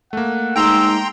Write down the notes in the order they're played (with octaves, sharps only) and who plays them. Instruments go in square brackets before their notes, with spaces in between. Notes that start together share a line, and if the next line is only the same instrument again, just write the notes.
[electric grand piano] A3 A#3 [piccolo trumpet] F#5
[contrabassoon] G#2 [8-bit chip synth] G5 A#5 C6 [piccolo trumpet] E6